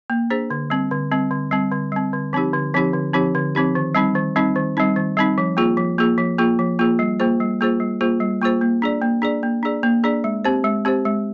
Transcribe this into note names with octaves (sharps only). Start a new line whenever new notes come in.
A#3
D4 G#4 C5
D3
G3 C4
D3
G3 C4
D3
G3 C4
D3
G3 C4
D3
F3 C4 D#4 G4
D3
F3 C4 D#4 G4
D3
F3 C4 D#4 G4
D3
F3 C4 D#4 G4
D#3
G3 C4 D#4
D#3
G3 C4 D#4
D#3
G3 C4 D#4
D#3
G3 C4 D#4
F3
A#3 F4 G#4
F3
A#3 F4 G#4
F3
A#3 F4 G#4
F3
A#3 F4 G#4
G3
A#3 F4 G#4 C5
G3
A#3 F4 G#4 C5
G3
A#3 F4 G#4 C5
G3
A#3 F4 G#4 C5
A#3
D4 G#4 D5
A#3
D4 G#4 D5
A#3
D4 G#4 D5
A#3
D4 G#4 D5
G#3
C4 G4 C5
G#3
C4 G4 C5
G#3